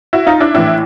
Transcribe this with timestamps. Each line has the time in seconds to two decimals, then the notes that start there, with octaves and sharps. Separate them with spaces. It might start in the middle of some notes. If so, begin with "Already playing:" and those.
0.13 E4 F#4
0.26 D#4 F4
0.40 D4 E4
0.54 A#1 A2 E3 D4 E4